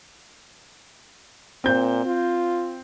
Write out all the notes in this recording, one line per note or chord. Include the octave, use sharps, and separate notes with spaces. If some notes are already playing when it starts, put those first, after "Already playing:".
A#2 C4 G6
F4